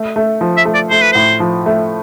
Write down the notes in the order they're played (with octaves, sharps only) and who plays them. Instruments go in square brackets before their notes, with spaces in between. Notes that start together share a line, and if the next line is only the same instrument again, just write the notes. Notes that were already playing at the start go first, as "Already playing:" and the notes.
Already playing: [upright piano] A3
A3
F3
[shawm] E5
[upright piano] A3
[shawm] D5
[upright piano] A3 [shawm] C5
[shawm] B4
[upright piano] A2 [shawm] C5
[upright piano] F3
A3